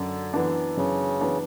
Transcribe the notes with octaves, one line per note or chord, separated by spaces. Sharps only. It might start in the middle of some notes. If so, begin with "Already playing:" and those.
Already playing: F#2 D3
E3 B3 D4
F#2 C#3
E3 B3 D4